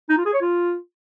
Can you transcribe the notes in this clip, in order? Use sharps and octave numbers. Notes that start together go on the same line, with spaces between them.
D#4
F4
G#4
C#5
F4